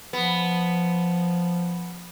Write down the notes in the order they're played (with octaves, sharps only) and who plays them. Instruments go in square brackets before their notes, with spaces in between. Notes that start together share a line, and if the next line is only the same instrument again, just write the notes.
[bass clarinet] F3 [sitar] B3